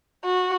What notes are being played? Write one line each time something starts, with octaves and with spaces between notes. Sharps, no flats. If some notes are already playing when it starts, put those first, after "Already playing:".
F#4